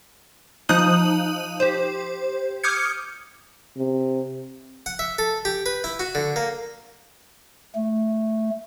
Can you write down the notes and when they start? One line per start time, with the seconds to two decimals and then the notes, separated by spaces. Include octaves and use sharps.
0.69 F3 D#4 D#6 F#6 D#7 F#7
1.60 G4 C5
2.63 D6 D#6 F6 G6 G#6 C#7
3.77 C3
4.86 F#5
4.99 E5
5.18 A4
5.45 G4
5.66 B4
5.84 E4
6.00 F#4
6.15 D3
6.36 A#3
7.75 A3